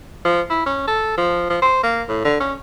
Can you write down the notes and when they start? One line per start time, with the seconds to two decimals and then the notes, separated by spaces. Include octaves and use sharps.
0.25 F3
0.50 E4
0.66 C#4
0.87 A4
1.18 F3
1.50 F3
1.62 C5
1.83 A#3
2.08 A2
2.25 D3
2.40 C#4